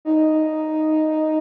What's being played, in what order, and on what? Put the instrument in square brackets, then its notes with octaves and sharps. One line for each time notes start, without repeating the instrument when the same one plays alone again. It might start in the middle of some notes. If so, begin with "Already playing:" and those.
[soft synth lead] D#4